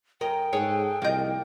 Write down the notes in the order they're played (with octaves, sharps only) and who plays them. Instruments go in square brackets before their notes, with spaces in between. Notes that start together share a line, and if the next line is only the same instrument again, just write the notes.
[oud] F#2 A#4 [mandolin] D#5 [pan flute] G5
[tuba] G#2 [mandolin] G#4 A4 F#5 [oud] C#5
[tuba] C2 [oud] F3 D#5 [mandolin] A#3 G6